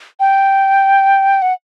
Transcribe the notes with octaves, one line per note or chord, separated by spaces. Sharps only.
G5
F#5